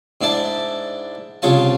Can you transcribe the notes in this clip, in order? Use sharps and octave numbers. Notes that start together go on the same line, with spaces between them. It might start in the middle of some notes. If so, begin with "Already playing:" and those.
G#2 D4 E4 D5 A5
C2 C#3 F4 C#5 F5 A5